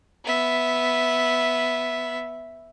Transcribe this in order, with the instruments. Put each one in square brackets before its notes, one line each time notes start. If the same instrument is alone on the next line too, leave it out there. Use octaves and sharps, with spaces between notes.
[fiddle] B3 E5